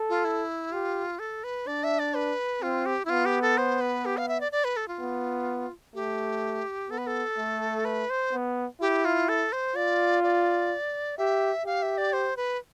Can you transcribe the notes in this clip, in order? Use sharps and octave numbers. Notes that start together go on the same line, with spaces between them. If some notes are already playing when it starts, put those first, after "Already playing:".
Already playing: A4
F4
E4
F4 G4
A4
B4
D4 D5
E5
D5
B4
C4 F4
G4
E4
B3 F4
G4
A4
C5
B4
G4
F5
E5
D5
D5
B4
A4
F4
B3
A3 G4
B3 A4
B4
A4
A3
B4
C5
B3
E4 G4
F4
A4
C5
F4 D5
D5
G4 E5
G4 F5
E5
D5
C5
B4